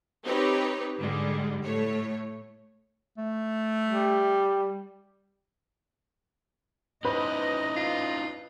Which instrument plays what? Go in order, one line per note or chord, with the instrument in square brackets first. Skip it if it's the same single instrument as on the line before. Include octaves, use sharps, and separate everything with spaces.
[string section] C4 D#4 G4 B4 C#5
G#2 D3 G3 G#3
A2 A3 C#5
[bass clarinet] A3
[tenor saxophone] G3
[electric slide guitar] C#4 D#4 E4 [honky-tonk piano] B4 C5 [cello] D#5
[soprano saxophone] F4